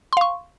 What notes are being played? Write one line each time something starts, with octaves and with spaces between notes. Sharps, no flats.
F5 C6 C#6